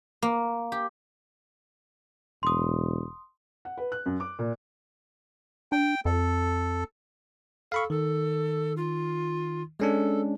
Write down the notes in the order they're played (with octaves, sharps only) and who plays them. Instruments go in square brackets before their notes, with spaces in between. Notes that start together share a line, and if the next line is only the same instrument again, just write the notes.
[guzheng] A#3
G4
[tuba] E1 [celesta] C6 D#6
[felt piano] F#5
B4
F#6
F#2
D6
A#2
[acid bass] D4 [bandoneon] G5
[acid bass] F2 [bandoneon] A4
[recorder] A4 [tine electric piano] F5 B5 C#6
[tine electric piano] D#3 [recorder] A4
[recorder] F4
[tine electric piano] G#3 C#4 D4 [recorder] A4